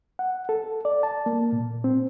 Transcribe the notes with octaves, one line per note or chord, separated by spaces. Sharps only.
F#5
A4
D5
A5
A#3
A#2
C4